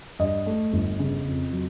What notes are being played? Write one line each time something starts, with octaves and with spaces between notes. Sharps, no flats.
G2 D#5
A3
G1
C#3
F2
F#3